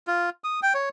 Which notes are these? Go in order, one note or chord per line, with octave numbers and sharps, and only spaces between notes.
F4
D#6
G5
C#5